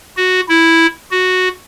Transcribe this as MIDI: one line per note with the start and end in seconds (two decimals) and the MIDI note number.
0.17 0.41 66
0.49 0.86 64
1.11 1.49 66